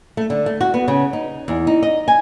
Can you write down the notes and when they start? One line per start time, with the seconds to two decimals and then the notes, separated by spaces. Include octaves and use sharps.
0.17 A3
0.30 D3
0.46 A3
0.61 F#4
0.74 B3
0.88 C#3
1.13 D#4
1.48 E2
1.67 D#4
1.83 D#5
2.08 G#5